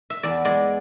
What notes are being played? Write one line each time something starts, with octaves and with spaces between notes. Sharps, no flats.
E5
E2 D5
G#3 D5